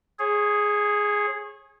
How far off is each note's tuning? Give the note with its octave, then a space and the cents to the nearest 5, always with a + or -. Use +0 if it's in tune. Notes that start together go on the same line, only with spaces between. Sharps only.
G#4 +0 C#5 -30